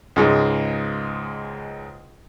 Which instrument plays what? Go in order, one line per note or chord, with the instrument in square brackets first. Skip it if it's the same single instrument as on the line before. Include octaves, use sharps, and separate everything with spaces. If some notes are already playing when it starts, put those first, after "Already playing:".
[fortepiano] C#2 G#2 G#3